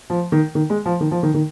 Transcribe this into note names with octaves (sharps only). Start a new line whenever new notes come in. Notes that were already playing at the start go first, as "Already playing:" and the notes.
F3
D#3
D#3
G#3
F3
D#3
F3
D#3
D#3